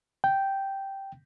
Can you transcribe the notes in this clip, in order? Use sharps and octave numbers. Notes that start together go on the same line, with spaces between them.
G5